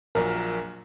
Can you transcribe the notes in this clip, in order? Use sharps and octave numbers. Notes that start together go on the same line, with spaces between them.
A#1 A#2 F#3 A#4